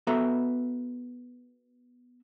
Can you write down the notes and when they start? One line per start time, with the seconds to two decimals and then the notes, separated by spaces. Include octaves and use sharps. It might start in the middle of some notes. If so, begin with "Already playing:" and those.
0.07 B3 F#4 A4 B4 E5 A#5